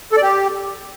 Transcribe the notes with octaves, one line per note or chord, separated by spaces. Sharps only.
A4
D5
G4